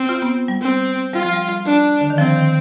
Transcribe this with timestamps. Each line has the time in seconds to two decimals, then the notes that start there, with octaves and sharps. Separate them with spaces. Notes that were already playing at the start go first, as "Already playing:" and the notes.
Already playing: C4
0.09 F4
0.22 B3
0.48 G3
0.61 C4
1.13 G3 F4
1.23 F3
1.33 G3
1.66 D4
2.01 D3
2.10 D#3
2.17 F3 C4
2.36 D#3